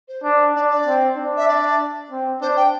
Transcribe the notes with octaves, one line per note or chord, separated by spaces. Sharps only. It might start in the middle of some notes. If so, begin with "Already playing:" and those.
C5
D4
D4 D5
D5
C4
D4
E5
D5
C4
D4 C5
G5